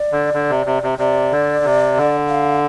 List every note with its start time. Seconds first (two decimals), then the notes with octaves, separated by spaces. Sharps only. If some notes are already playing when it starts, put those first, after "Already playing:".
Already playing: D5
0.12 D3
0.34 D3
0.50 C3
0.66 C3
0.83 C3
0.99 C3 D5
1.32 D3
1.64 C3
1.97 D3
2.29 F5